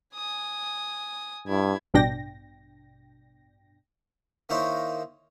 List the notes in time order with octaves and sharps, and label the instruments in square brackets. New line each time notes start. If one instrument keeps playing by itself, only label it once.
[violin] G#5 D#6
[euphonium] G2 [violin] E4 G#6
[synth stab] A1 G2 B2 D4 G5 A#6
[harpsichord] D#3 A#3 D#4 E4 C5 C#5